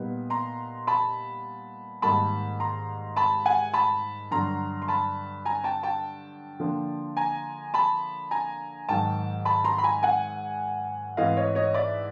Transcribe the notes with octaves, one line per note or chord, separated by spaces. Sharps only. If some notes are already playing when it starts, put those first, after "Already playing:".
Already playing: A#2 G3 B3 D#4
A#5 C6
A5 B5
G#2 D#3 G3 A#3 A5 B5
A#5 C6
A5 B5
F#5 G#5
A5 B5
G2 D3 F#3 A#5 C6
C6
A5 B5
G#5 A#5
G5 A5
G5 A5
D3 F3 A#3 D4
G#5 A#5
A5 B5
G#5 A#5
G#2 D#3 F#3 G5 A5
A5 B5
A#5 C6
B5
G#5 A#5
F#5 G#5
G#2 E3 A3 C4 D#4 D#5 F5
C#5 D#5
C#5 D#5
D5 E5